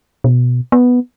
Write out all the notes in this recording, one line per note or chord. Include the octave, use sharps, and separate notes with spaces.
B2
B3